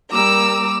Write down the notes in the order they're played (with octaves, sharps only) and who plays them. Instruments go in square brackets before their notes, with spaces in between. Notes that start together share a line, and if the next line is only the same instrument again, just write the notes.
[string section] G3 A#3 [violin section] A#5 E6 [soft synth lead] D6